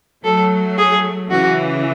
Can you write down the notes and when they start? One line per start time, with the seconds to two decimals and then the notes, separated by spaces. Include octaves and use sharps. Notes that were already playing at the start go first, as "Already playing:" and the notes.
0.24 F#3 A3 A4
0.78 G#4
1.30 C#3 E3 F#4